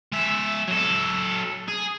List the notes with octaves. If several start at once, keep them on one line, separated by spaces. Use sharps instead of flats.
G#3 E5
F#3 A4
G#4